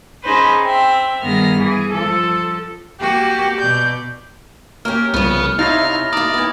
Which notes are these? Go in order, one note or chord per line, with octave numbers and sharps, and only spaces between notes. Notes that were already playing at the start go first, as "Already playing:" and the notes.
C#4 D#4 G#4 B4 C5
C4 E5
G2 D#3 B3 G#4 F6 A#6
E3 G#4
F3 A4
A#3 F#4 G4
B2 D5 G6
A#3 C#4 G4 F6
C2 C#3 F3 B3
C3 C#4 D#4 E4 F5 A6 A#6
F4 D5 A#5 D6 D#6
B3 G#5